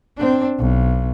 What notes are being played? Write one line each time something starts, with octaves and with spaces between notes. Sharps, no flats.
C4 D4
B1